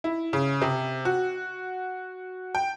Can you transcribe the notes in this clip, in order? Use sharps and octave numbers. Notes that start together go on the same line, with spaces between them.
E4
C#3
C3
F#4
G5